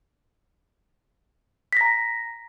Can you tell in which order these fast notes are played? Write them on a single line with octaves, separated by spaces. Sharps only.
B6 A#6 A#5